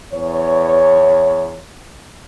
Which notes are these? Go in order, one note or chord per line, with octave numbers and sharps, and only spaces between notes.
E2 C#5